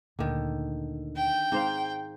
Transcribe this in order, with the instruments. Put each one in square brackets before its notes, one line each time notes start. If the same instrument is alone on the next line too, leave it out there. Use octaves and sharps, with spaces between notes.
[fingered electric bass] D2 A#2 [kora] D3 D#3
[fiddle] G5
[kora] G#2 C5 F5 [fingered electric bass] C4